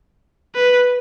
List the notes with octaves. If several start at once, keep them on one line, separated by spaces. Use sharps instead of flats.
B4